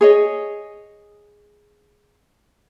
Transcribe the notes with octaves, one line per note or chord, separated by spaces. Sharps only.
G#4 C#5 D#5